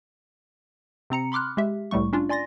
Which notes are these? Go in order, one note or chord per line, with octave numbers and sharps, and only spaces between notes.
C3 C4 A#5 C#7
B5 C6 D6 F6 F#6
G#3 G4 E5
C2 A2 G3 A3 C#6
C#4 D4 F4
D5 G#5 C6 A6 A#6